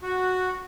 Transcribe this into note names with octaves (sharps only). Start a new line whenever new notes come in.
F#4